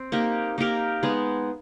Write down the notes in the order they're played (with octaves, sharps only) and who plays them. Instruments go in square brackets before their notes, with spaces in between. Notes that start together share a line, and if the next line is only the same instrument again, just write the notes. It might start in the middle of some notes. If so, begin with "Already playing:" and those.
Already playing: [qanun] C4
A#3 D#4 G4 A#4
A#3 D#4 G4 A#4
G#3 B3 D#4 G#4